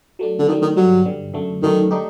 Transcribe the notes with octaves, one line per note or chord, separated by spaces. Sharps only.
F#3 A3 D4
D3
D#3 F#3 A3 D4
D#3
G2 D3 F#3 G3
G2 D3 G3
F#2 D3 A3
F#2 D3 D#3 A3
D3 A3 D#4 G4